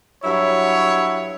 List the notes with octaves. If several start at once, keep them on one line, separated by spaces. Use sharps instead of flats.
G2 F#3 E4 C#5